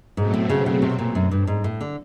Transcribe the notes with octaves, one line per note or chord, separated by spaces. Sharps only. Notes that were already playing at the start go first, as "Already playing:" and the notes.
G#2 B2 F#3 A3 C4
A2
C#3
C#3
C3
A#2
F#2
G2
G#2
A2
D3